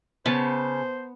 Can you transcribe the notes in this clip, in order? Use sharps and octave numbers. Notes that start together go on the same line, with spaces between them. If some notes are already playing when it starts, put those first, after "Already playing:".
C#3 B3 C5 A5